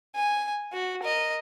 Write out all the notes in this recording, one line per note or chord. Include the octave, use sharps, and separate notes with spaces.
G#5
F#4
A#4 D#5